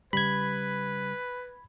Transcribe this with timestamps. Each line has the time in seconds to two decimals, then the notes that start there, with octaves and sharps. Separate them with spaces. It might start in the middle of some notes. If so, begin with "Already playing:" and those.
0.13 C#3 G3 B4 B5 G#6